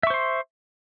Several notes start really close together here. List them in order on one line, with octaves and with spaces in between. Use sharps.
E5 C#6 C5 C6